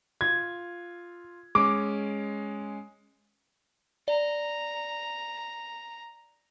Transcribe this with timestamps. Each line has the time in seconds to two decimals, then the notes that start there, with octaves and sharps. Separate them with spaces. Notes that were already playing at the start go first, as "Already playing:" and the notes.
0.21 F4 G#6
1.55 G#3 C#4 D6
4.08 D5 A#5